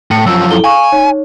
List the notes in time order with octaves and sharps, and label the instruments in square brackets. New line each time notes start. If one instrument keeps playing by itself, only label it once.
[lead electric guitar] A2 [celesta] C#7
[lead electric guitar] F#2 F3 [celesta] E6
[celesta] E4 A4 G7
[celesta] F5 C#6 [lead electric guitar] G#5
[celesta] D#4 C#5